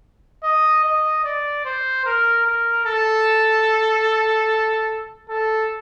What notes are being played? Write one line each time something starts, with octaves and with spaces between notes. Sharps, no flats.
D#5
D#5
D5
C5
A#4
A#4
A4
A4